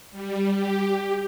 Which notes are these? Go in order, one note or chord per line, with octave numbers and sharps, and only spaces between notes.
G3
G4